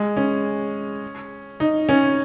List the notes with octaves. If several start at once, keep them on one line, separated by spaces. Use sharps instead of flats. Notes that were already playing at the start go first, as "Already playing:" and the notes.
Already playing: G#3
C#4
D#4
C#4